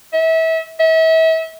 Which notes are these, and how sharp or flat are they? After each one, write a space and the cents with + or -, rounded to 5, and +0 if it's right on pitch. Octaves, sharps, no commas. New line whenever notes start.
E5 -30
E5 -35